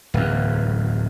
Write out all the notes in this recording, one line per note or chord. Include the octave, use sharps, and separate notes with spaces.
D1 E2